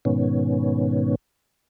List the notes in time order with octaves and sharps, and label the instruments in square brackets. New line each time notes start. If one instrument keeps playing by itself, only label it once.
[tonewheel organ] G#2 B2 D#3 B3 C#4